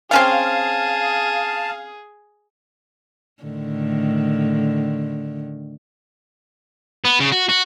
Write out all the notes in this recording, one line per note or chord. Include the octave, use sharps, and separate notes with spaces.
C4 C#4 G#4 F5 G5 A5
A2 D3 D#3
B3
C#3
F#4
F#4